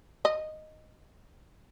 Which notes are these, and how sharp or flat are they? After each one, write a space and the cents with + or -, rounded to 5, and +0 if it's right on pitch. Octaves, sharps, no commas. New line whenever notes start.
D#5 -5